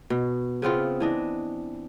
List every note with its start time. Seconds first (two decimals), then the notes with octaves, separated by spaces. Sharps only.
0.10 B2
0.62 C#3 B3 C4 F4
1.00 E3 D4 D#5